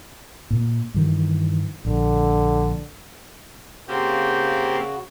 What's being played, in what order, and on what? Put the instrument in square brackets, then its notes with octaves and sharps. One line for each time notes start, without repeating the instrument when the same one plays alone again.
[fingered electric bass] A#2
G2 D#3 E3
[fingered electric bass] A#1 [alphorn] D3
[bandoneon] C#3 F#4 [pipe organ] A#3 C4 G4